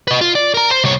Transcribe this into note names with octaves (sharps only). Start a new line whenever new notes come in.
B4 D#5
F4
D5
A#4 A#5
C5
C2 C#5